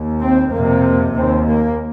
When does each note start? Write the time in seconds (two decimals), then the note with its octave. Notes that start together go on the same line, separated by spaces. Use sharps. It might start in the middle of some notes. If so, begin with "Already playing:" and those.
Already playing: D#2
0.20 C4
0.52 F2 C3 A#3
1.15 D#2 C4
1.47 A#3